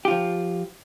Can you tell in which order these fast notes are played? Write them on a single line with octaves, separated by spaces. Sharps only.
G4 F4 F3